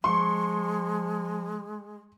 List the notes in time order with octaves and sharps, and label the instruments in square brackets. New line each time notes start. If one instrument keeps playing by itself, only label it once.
[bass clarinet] F3 [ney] G#3 [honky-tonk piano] C6 C#6